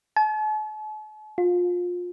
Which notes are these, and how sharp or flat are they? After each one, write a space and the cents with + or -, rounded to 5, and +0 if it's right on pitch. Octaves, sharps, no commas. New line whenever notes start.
A5 -45
F4 +25